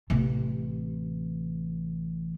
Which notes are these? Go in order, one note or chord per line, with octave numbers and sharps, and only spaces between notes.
A1 C3